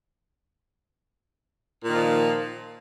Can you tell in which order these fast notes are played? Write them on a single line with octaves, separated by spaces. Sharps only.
A#2 D#3 F3